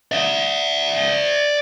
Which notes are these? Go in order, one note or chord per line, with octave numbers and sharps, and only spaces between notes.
D5 E5